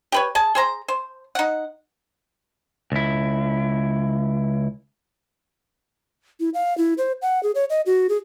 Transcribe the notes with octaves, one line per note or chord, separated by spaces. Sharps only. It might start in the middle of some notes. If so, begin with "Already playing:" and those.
G4 B4 C#5
G#4 A5
G#4 C5 A#5
C5
D#4 F#5
C#2 E4
E4
F5
E4
C5
F#5
G#4
C#5
D#5
F#4
G#4